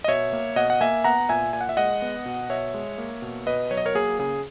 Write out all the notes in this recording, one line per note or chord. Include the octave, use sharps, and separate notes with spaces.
D#5
B2 C#5 E5
A#3
B2 D#5 F#5
F#5
A#3 E5 G#5
B3 F#5 A#5
A#2 E5 G#5
A#2 G#5
F#5
E5
G#3 D#5 F#5
B3
B2
B2 C#5 E5
G#3
A#3
B2
B2 B4 D#5
F#3 C#5
D#5
A#4 C#5
A#3 G#4
C#3 G#4